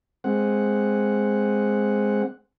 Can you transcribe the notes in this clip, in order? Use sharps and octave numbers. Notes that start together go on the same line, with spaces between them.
G#3 C4 F#5